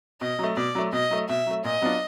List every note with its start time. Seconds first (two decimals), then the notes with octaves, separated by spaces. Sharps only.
0.21 B2 D#5
0.39 F#3 A3
0.56 B2 D5
0.75 F#3 A3
0.92 B2 D#5
1.11 F#3 A3
1.29 B2 E5
1.46 F#3 A3
1.64 A#2 D#5
1.81 F#3 B3 D4 F4